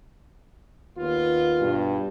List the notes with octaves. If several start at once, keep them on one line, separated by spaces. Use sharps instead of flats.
D#2 B3 F4
G2 B2